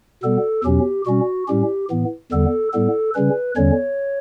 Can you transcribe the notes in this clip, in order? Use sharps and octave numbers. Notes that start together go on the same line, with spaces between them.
B2 G3 B3 A4
E2 B2 F#3 C#4 G4
B2 G3 C#4 F#4
A2 G3 C#4 G4
A2 E3 B3
E2 D3 G3 B3 A4
A2 G3 B3 A4
C#3 G3 C#4 B4
E2 D3 G3 C#4 C#5